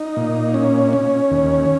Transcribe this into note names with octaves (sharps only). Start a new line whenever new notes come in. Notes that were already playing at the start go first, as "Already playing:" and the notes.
Already playing: D#4
A#2
C#4
C#4
D#2